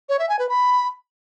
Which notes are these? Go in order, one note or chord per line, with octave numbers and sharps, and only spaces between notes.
C#5
E5
G#5
B4
B5